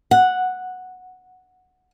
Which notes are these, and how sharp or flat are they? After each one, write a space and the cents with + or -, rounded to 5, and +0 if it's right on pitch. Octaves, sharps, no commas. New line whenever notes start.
F#5 -5